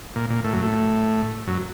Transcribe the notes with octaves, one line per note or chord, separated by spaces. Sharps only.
A#2
A#2
A2
F#2
A2
F#2